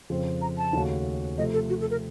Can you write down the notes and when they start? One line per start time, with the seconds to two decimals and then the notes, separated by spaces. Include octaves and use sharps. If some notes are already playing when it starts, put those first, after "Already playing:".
0.10 F2 C#3 F3 C4
0.42 A#5
0.58 A5
0.73 D#2 C#3 A3 C#4 F#4
1.38 C3 F3 A3 D#5
1.53 A4
1.69 F#4
1.81 A4
1.90 A#4